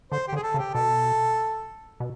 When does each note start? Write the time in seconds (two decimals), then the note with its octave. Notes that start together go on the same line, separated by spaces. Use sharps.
0.12 D3 C5
0.28 D3 G4
0.36 G#4
0.43 A4
0.54 C#3
0.59 G4
0.74 B2 A4
2.00 B2